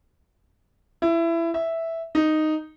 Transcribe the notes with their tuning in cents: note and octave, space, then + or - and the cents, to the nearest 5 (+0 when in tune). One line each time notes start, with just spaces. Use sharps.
E4 +20
E5 -5
D#4 -5